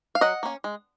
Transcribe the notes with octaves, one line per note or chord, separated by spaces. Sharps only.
F5
F#3 D#5 F#5
A#3 C#4
G#3